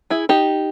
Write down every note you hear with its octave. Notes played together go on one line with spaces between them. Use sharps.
E4 G#4
D#4 G4